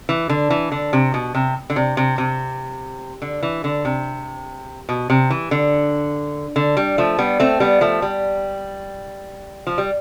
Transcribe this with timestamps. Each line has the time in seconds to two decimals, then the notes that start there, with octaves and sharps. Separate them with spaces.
0.09 E3
0.29 D3
0.50 E3
0.72 D3
0.93 C3
1.14 B2
1.35 C3
1.70 D3
1.76 C3
1.97 C3
2.18 C3
3.22 D3
3.43 E3
3.64 D3
3.85 C3
4.89 B2
5.10 C3
5.30 E3
5.51 D3
6.56 D3
6.77 G3
6.98 F3 A3
7.18 G3 B3
7.40 A3 C4
7.60 G3 B3
7.81 F3 A3
8.02 G3
9.67 F3
9.78 G3